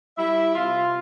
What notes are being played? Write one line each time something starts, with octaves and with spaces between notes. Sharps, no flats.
G3 E4 E5
C3 F4 F5